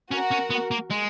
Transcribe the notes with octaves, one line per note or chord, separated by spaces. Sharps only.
C#4 F#4 A#4
C#4
B3
A#3
G#3